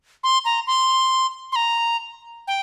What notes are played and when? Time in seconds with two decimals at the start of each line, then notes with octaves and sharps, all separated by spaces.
0.23 C6
0.45 A#5
0.67 C6
1.52 C6
1.56 A#5
2.47 G5